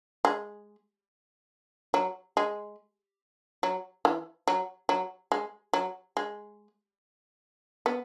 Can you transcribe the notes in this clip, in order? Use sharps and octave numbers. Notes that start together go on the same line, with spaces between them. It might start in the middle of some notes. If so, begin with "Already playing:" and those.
G#3
F#3
G#3
F#3
E3
F#3
F#3
G#3
F#3
G#3
B3